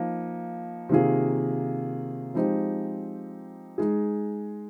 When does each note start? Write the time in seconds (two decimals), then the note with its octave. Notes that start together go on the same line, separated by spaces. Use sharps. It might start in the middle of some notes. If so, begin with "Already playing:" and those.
Already playing: F3 A#3 D#4
0.89 C3 D#3 A#3 F4 G#4
2.34 F3 G#3 C4 D#4 G4
3.78 G#3 D#4 G#4